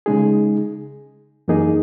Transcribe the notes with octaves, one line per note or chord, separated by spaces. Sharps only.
C#3 G#3 D#4 G#4
F#2 E3 A#3 D#4 G#4